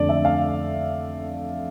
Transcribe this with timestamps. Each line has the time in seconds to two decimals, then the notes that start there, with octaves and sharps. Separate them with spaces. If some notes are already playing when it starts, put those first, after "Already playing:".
Already playing: F2 D3 A3 D4 D5
0.09 E5
0.25 F5